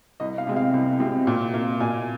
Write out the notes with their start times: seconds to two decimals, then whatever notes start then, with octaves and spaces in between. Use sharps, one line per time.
0.20 C2 D#5
0.38 F5
0.47 C3 G#3 C4
0.56 F5
0.74 C2
1.00 C3 G#3 C4
1.27 A#2
1.54 A#3
1.80 A#2 G#5